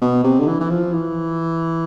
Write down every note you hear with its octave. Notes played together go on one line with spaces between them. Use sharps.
B2
C3
D3
E3
E3
F3
E3